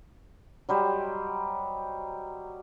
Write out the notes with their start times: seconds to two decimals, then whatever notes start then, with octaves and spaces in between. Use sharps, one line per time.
0.69 F#3 G3 C5 D#5